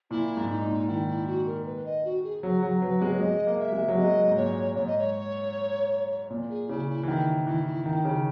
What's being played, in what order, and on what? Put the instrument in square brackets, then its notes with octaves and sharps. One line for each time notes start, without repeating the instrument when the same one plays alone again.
[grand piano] A#2 [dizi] E4
[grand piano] G#2
[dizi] D#4
[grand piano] A#2
[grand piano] D#3 [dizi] E4
[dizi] E4
F#4
A#4
B4
D#5
F#4
G#4
[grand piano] F#3 [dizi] G#4
[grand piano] F#3
[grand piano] F#3 [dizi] B4
[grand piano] G#3
[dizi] C#5
[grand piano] G#3 [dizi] D#5
[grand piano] A#3
[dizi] E5
[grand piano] G#3
F#3
[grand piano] G#3 [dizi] D#5
[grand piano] G#2
[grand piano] A#2 [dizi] C#5
[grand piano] G#2 [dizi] C#5
[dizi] D#5
C#5
[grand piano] A#2
[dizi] G#4
[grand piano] C#3 [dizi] E4
[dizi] E4
[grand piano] E3
[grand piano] D#3 [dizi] E4
[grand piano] E3 [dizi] E4
[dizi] E4
[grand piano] D#3 [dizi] E4
[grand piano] C#3